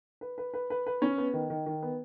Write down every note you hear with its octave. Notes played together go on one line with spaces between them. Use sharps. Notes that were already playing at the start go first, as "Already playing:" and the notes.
B4
B4
B4
B4
B4
C#4
B3
D#3
D#3
D#3
B3